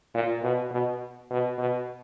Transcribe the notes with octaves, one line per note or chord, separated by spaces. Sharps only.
A#2
B2
B2
B2
B2